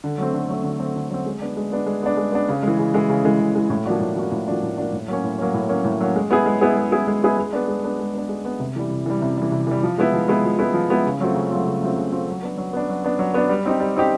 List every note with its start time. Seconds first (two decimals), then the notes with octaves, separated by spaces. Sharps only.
0.04 D3
0.18 F#3 A3 C4
0.33 D3
0.49 F#3 A3 C4
0.64 D3
0.79 F#3 A3 C4
0.96 D3
1.10 F#3 A3 C4
1.26 G#3
1.41 B3 D4
1.57 G#3
1.72 B3 D4
1.86 G#3
2.03 B3 D4
2.17 G#3
2.32 B3 D4
2.49 C#3
2.63 E3 G#3
2.79 C#3
2.94 E3 G#3
3.09 C#3
3.25 E3 G#3
3.40 C#3
3.55 E3 G#3
3.70 A2
3.85 F3 A#3 D4 F#4
4.00 A2
4.16 F3 A#3 D4 F#4
4.32 A2
4.47 F3 A#3 D4 F#4
4.63 A2
4.77 F3 A#3 D4 F#4
4.93 A2
5.08 F#3 A#3 C#4
5.24 A2
5.38 F#3 A#3 C#4
5.54 A2
5.69 F#3 A#3 C#4
5.85 A2
6.01 F#3 A#3 C#4
6.16 G#3
6.31 B3 E4 G#4
6.46 G#3
6.61 B3 E4 G#4
6.77 G#3
6.92 B3 E4 G#4
7.07 G#3
7.23 B3 E4 G#4
7.37 G#3
7.53 B3 D4
7.68 G#3
7.84 B3 D4
8.00 G#3
8.15 B3 D4
8.29 G#3
8.45 B3 D4
8.60 C3
8.76 E3 G3
8.91 C3
9.06 E3 G3
9.22 C3
9.37 E3 G3
9.52 C3
9.67 E3 G3
9.83 F3
9.98 G#3 B3 E4
10.14 F3
10.28 G#3 B3 E4
10.44 F3
10.59 G#3 B3 E4
10.74 F3
10.90 G#3 B3 E4
11.06 C#3
11.20 F#3 A3 C4 F4
11.36 C#3
11.51 F#3 A3 C4 F4
11.66 C#3
11.81 F#3 A3 C4 F4
11.96 C#3
12.12 F#3 A3 C4 F4
12.28 F#3
12.42 B3 D4
12.58 F#3
12.73 B3 D4
12.89 F#3
13.04 B3 D4
13.19 F#3
13.34 B3 D4
13.49 G3
13.65 C4 D#4 G4
13.80 G3
13.96 C4 D#4 G4